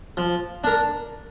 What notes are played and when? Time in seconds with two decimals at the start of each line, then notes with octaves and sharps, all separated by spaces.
0.17 F3
0.64 D4 A#4